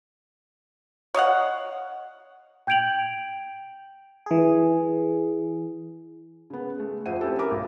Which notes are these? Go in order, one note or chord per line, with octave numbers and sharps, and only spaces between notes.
C#5 D#5 F5 F#5
G5 G6 G#6 D7 F7 F#7
E3 G#4
C#3 B3
G#3 A3
F2 C5 E5 F#5 D#7
C4 C#4 E4 G4 A4
A#4 E5 B5 D6
B1